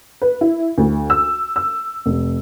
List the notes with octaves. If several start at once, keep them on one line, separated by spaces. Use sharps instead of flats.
B4
E4
D2
E6
E6
F1